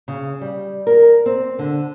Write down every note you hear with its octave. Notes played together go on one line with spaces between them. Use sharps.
C#3
G3
A#4
C4
D3